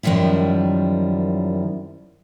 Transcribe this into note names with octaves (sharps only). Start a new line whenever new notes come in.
F#2 D#3 F3 G3 E4